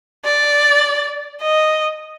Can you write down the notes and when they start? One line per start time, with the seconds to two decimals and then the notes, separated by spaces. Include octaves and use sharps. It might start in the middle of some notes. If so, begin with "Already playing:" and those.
0.25 D5
1.42 D#5